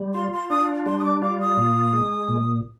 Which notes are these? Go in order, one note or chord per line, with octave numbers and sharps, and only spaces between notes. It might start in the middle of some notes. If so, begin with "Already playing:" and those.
Already playing: G3
F4 C6
C6
D4 D#6
G3 C6
D#6
D6
F4 D6
D#6
A#2
G#3
A#2